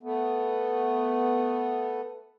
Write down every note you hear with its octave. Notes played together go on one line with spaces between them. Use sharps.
A3 B3